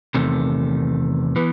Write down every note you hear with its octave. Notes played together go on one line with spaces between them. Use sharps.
E2 C3 D#3 A3
E3 B3